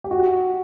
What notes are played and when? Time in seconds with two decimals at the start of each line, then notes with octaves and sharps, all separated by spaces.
0.04 G4
0.11 F#4